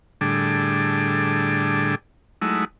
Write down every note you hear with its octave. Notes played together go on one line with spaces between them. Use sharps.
A2 D3 G3 D4 G#4
F#3 G#3 A3 D#4 E4